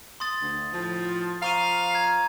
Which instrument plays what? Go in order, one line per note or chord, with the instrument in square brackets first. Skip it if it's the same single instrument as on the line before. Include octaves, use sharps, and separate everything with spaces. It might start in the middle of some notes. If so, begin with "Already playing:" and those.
[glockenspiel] C6 D#6 A6
[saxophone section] D2
A2 F3
[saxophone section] F3 F5 [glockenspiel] A#5 C#6 D#7
[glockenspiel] A#5 G#6